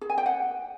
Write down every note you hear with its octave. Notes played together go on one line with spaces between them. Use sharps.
G#4
G#5
G5
F#5